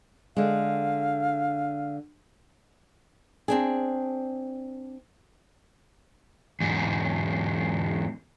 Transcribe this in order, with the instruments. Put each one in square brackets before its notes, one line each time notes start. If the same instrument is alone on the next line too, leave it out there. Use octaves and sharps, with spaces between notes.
[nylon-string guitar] D3 G#3 [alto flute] F5
[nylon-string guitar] C4 D4 G#4
[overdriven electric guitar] E2 G#2